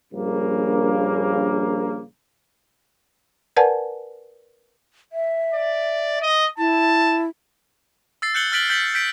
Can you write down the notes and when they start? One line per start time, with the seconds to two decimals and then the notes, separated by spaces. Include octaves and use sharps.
0.13 A#1 G2 C#3 A#3
3.56 A#4 B4 D5 F#5 G#5 A5
5.13 E5
5.54 D5
6.22 D#5
6.58 E4 A5
8.22 E6 A6 C7
8.35 F#6 G6 C#7 F#7 G7
8.52 F6 A6 B6 D7 F#7 G7
8.70 G6 A6 B6 F#7
8.94 G6 B6 D7